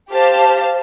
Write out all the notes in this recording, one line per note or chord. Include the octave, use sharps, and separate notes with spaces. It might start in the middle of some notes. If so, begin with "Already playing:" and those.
G4 C5 F5 A5